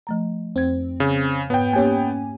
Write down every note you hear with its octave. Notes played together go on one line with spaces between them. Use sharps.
F3 A3 A#5
F2 C4 G#6
C#3
G#2 B3 C#5 G5
A#3 C#4 G4 C#5 G#5